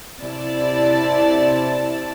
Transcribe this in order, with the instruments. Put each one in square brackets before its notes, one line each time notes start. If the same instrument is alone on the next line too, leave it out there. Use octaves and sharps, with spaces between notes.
[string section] C3 E4 D5 A5